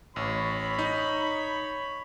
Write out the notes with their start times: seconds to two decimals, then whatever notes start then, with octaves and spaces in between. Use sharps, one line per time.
0.16 A1 C#5 B5
0.79 D#4